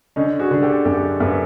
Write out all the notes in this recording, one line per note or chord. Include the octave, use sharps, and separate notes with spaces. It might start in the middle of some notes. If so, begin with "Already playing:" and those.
D3 C#4 D#4
F#4 G#4
D3
G4 A4
F#2 G4 A4
F#2 A4 B4